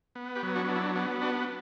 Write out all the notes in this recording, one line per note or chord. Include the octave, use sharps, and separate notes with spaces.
B3
G4 B4
F#3
D4 F#4
D4
E4
B3 D4
D4 F#4